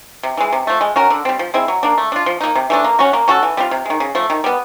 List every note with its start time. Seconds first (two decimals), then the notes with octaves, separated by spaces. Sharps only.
0.23 C3
0.37 E3 G#3
0.52 C3
0.67 F3 A3
0.81 G#3
0.96 C#4 F#4 A#4
1.10 D3
1.25 G3 C4
1.39 F3
1.54 G#3 C4 E4
1.68 F#3
1.83 A#3 D4
1.98 A3
2.12 D4 F4
2.26 F3
2.41 A#3 D#4
2.55 C3
2.70 E3 A3 D4
2.84 A#3
2.99 C#4 F#4
3.13 A#3
3.28 C#4 F#4 A4
3.43 E3
3.57 G3 C4 F4
3.71 C3
3.86 D#3 G#3
4.00 C#3
4.15 F3 A3
4.30 D#3
4.44 G3 B3